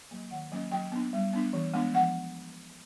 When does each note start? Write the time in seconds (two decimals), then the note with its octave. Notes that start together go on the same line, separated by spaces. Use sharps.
0.11 F#3 A#3
0.31 D#3 F#5
0.52 F#3 A#3 C#4
0.71 F#3 G5
0.92 B3 D4
1.13 G3
1.33 B3 D4
1.53 E3
1.74 G#3 B3 D4
1.93 F3 F#5